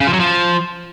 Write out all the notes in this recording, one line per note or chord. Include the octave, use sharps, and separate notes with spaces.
C#3
F3
F#3
F3